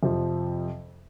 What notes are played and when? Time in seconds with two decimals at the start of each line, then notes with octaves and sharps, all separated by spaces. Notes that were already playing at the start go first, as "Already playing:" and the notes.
0.03 F2 C3 F3